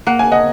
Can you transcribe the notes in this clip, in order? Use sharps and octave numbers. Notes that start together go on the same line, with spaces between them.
A#3 F#5
G#5
D#5 F#5